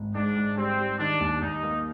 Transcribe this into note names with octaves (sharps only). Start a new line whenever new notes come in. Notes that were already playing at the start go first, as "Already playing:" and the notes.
Already playing: G#1
G#2 D4
G#2
G3 C4
G3
D#3 D4
D#2
D#2 D#4
A#3